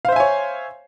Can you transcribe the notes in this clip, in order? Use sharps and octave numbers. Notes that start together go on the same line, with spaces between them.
C5 C#5 E5 F5 G#5